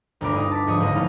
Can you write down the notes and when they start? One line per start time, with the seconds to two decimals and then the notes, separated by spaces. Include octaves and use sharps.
0.21 G1 D2 B2 A#4 B5 D6
0.34 G2 D#4 D#6
0.52 A5 D6 B6
0.67 D2 G#2 F3 C#6 D#6
0.80 F#1 C#2 D3 B3 D#5 A#6
0.94 A3 B3 C#4 D#4 E4 F5